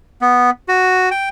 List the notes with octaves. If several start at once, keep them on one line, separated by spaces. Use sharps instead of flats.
B3
F#4
G5